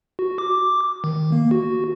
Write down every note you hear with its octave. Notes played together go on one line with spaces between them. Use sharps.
F#4
D6
D#3
A#3
F#4